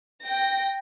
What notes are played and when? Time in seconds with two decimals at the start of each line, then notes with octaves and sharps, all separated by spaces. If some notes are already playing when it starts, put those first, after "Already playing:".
0.23 G5 A#6